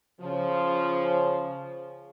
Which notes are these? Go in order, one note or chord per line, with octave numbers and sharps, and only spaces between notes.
C#3 F3